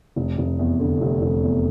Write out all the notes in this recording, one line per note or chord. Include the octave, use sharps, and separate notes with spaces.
F1
F1
E2
D3
F1
F1
E2